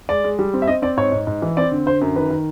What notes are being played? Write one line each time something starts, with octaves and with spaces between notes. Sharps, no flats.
G#3 D5
G#3
G3
C4
E5
C4 D#5
C4 D5
G#2 C#5
G#2
G#2
E3
C4 D5
D3
D3 C5
F#2
D#3 B4
D#3